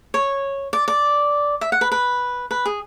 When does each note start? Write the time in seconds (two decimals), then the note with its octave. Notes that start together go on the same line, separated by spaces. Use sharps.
0.14 C#5
0.73 D5
0.88 D5
1.61 E5
1.72 F#5
1.81 B4
1.92 B4
2.51 B4
2.66 G#4